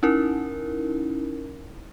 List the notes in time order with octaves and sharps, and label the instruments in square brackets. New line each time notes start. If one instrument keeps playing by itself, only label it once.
[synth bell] C#4 D#4 E4 A#4